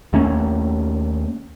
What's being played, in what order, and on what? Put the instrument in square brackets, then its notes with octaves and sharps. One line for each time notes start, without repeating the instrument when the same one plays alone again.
[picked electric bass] D#2 A3 A#3 C#4